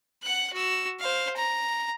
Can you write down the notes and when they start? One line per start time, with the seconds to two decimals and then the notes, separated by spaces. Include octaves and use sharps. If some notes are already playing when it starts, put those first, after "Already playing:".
0.23 F#5 F#6
0.54 F#4 E6
1.00 C5 F5
1.36 A#5